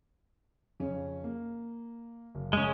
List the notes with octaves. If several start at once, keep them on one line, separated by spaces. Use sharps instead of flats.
F2 C#3 C#4
A#3
F#1
G#3 C#4